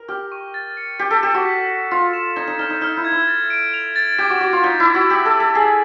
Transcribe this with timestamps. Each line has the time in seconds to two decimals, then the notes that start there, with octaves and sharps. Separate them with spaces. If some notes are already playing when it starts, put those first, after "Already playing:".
Already playing: A#4
0.08 G4 F6
0.32 C#6
0.54 A6
0.77 C#7
0.99 G4 A6
1.11 A4
1.22 G4 E7
1.34 F#4
1.45 B6
1.68 B6
1.91 F4 B6
2.13 E7
2.36 D#4 G#6
2.48 D#4
2.59 D#4 F6
2.70 D#4
2.81 D#4 F6
2.97 E4
3.05 G#6
3.12 E4
3.28 A6
3.50 D7
3.74 F7
3.96 A6
4.18 G4 D6
4.30 F#4
4.41 F#4 D6
4.53 F4
4.63 D#4 B6
4.80 E4
4.87 D6
4.95 F#4
5.09 G4 E6
5.25 A4
5.32 C#6
5.40 A4
5.55 G#4 E6